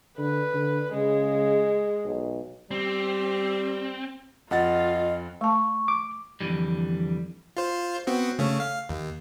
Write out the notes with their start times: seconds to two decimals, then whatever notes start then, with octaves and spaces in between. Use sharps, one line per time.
0.18 D3 B4
0.54 D3
0.93 C#3 G#3
2.04 B1
2.71 G3 C4
4.51 F2 F4 D#5 F#5 A6
5.41 A3 A5 C#6
5.88 D6
6.41 F2 B2 D3 E3 G3
7.57 F4 C5
8.07 B3 C4 F#4
8.39 C#3 A3 C#4
8.60 F5
8.89 D#2